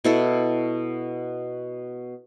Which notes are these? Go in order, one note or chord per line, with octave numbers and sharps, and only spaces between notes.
B2 E4 A4